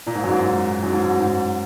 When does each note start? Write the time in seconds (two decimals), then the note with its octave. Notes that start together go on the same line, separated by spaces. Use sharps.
0.07 A#2
0.15 G#2
0.24 F#2
0.32 G#2
0.83 F#2
0.93 G#2
1.04 F#2
1.20 G#2